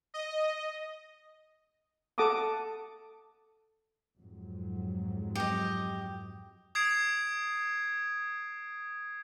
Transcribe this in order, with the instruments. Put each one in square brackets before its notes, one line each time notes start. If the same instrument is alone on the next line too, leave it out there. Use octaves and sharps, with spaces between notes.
[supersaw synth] D#5
[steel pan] A4 F#5 A5 D6 D#6
[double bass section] F2 G#2 F#3
[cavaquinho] G4 D#5
[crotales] D#6 G#6 C7 D7